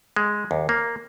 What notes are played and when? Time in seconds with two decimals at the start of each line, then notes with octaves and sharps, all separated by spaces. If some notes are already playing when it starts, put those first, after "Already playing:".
0.17 G#3
0.51 D#2
0.69 A#3